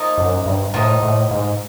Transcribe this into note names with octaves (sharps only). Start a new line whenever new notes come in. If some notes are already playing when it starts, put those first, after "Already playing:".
Already playing: F3 A#3 D#4
F#2
G2
A2 F3 A#3 D#4
A2
G#2